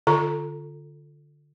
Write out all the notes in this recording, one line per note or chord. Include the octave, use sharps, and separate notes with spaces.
D3 F4 A4 A#5 C#6